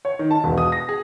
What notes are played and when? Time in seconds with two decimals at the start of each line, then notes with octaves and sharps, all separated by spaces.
0.05 C#5
0.19 D#3
0.31 A5
0.44 E1
0.58 D#6
0.72 A#6
0.89 G#4